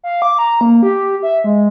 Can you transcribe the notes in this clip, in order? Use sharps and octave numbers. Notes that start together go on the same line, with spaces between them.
F5
D6
A#5
A#3
G4
E5
G#3